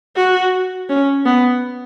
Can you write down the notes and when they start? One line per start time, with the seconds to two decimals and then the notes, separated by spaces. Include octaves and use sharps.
0.16 F#4
0.89 C#4
1.25 B3